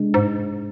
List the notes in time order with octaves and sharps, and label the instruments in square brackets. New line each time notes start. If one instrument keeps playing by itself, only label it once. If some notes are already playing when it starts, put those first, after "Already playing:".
Already playing: [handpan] C3 G#3 D4
[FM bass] G#2